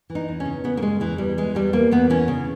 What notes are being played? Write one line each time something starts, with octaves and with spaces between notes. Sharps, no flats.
E3
D#4
E2
C#4
C#3
C#3 B3
A#3
C#3 G#3
E2 E3
E2 G3
E3 G#3
E2 G3
E2 A#3
E2 B3
E3 C#4
C#3